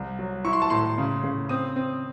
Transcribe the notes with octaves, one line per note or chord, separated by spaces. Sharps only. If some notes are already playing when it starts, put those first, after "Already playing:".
Already playing: C2
F#3
E4 C#6
C6
A5
A2 C6
C#3
C#3
C4 D#6
C4